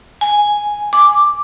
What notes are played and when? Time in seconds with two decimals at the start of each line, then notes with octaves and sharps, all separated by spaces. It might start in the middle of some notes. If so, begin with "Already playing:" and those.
0.21 G#5
0.93 D6